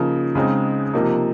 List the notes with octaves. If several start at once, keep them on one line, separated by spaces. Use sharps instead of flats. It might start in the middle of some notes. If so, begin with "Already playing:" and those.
Already playing: C#3 F3 A#3 D#4
C#3 G#3 C4 D#4
C3 F3 A#3 D#4